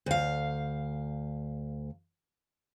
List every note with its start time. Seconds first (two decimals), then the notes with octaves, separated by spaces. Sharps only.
0.06 D2 F5